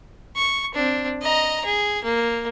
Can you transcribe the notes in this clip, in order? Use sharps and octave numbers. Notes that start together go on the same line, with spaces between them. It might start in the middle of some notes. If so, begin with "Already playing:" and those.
C#6
C4 D4
D#5 A#5
G#4
A#3